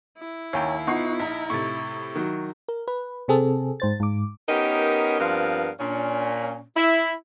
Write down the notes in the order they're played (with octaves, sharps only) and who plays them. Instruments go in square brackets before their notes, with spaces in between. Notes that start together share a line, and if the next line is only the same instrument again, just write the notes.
[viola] E4
[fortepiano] D#2 G5 [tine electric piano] C#5 G#5 A#5
[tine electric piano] B3 F4 [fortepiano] D#4 [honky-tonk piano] F#5 C#6 C7
[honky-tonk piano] A#1 A#5 [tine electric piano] D#5 B6
[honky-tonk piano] A2 C3 [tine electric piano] C#6 A6
[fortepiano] D#3 F#3
[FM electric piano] A#4
B4
C3 C4 G#4 A4
G#2 C5 A6
G#2 D6
[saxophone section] B3 C#4 D#4 G4 A#4
G2 F3 B3 C4 A#4 F5
A#2 C#4 D4
E4